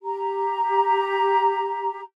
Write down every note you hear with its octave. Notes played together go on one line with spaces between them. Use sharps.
G4 A#5